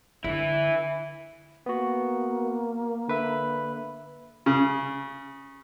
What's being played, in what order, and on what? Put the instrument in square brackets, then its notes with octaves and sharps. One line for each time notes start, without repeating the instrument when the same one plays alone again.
[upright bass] D3 [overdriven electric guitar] E3 E4
[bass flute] A#3 [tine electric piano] B3 F#4
[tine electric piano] D3 B4 E5
[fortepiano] C#3